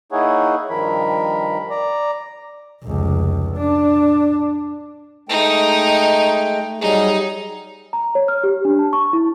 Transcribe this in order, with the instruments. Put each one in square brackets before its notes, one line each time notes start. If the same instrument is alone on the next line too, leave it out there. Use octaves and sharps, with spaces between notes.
[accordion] A#3 D#4 E4 G#4 C#5 F#5
G2 D#3 F3 A#4 B5
D5 A#5
[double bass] F1 C#2
D4
[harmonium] G#3 A3 G5 [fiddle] D#4
[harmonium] F#3 G3 G#4 [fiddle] D#4
[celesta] A#5
C#5
F6
G4
D4
A5
C#6
E4